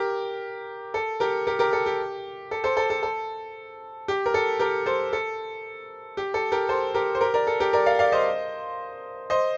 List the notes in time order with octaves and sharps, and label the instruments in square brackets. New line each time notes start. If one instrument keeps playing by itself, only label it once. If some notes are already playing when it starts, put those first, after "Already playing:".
Already playing: [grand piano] G4 A#4
A4
G4 A#4
G4 A#4
G4 A#4
A4
G4
A4
A4 C5
A4
A4
A4
G4
A#4
A4
G4 A#4
A4 C5
A4
G4
A4
G4 A#4
A4 C5
G4 A#4
C5
G4 A#4
A#4 D5
A4
G4 A#4
A#4 D5
D5 F5
D5 F5
C5 D#5
C5 D#5